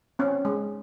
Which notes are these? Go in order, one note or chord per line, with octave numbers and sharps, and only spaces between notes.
C4 C#4
G#3